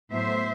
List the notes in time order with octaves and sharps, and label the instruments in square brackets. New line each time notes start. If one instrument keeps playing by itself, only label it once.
[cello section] A2 F#3 B3 C5 E5